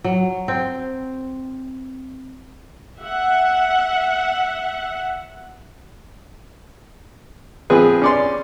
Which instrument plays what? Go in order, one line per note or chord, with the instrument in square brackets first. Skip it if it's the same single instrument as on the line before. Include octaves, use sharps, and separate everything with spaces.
[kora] F#3
C4
[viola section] E5 F#5
[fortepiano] F3 C4 G#4 B4
C#4 D5 C6